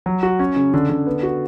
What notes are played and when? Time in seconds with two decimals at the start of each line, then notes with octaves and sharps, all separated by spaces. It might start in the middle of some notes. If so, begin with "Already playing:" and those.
0.06 F#3
0.23 F#4
0.39 C#4
0.56 C#3
0.74 D3
0.90 D3
1.07 B3
1.23 F#4